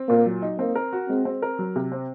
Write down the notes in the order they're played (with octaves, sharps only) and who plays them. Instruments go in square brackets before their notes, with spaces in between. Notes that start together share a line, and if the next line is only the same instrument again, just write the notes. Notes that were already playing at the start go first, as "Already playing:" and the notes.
Already playing: [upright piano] C4
[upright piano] A#2 [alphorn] A#3
[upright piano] F#3
D#4
[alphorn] A#3 [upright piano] C4
[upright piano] A#4
F#4
[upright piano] G#3 [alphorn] C4
[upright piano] C4
A#4
F#3
C3
C4